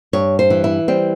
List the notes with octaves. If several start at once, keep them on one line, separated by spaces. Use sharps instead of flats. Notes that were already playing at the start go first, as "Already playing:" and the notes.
G2 C#5
C5
E3
E4
G3 C4